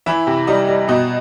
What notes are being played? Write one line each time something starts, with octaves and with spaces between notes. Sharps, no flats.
E3 E4 E5
C3
G3 D#4 D#5
G3
B2 D#4 D#5